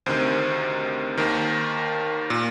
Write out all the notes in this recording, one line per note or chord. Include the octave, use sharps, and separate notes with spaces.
D2 C3 D#3 C5
D#2 D#3 A#4
A#2